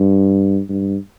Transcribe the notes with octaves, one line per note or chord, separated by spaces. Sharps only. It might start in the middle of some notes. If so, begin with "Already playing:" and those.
Already playing: G2
G2